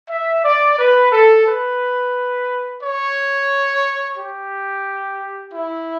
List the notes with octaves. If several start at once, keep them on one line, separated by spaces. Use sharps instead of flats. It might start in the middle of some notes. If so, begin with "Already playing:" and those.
E5
D5
B4
A4
B4
C#5
G4
E4